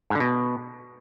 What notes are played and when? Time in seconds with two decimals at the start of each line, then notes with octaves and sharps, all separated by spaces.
0.10 G#2
0.15 D3
0.20 B2